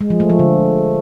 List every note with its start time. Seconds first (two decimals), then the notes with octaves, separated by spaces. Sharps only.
0.01 G#3
0.10 F3
0.20 A3
0.30 F3
0.39 D3